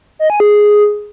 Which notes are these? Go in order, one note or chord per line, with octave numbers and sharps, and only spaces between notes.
D#5
G#5
G#4